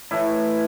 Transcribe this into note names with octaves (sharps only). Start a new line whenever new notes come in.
A2 E3 A3 E4